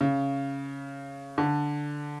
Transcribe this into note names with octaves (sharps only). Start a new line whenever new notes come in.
C#3
D3